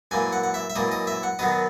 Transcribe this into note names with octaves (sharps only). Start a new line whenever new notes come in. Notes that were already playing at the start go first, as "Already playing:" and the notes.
F#2 E3 A#3 G#5
F#5
F#5
E5
E5
F#2 E3 A#3 D#5
D#5
E5
F#5
F#2 D#3 F#3 B3 D#5